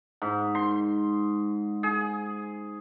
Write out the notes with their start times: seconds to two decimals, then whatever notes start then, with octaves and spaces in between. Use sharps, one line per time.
0.22 G#2
0.55 C6
1.83 G#4